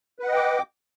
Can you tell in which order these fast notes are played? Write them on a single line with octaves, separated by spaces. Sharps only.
B4 F#5 D#5 G5 D6